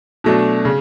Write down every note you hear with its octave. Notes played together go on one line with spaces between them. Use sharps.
B2 F#3 A3 D4
C#3